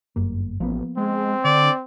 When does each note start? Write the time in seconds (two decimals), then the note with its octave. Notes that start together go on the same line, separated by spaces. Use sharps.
0.16 G1 F#2 A#3
0.60 A1 F3 A#3 B3
0.97 G#3 C4
1.44 D3 D5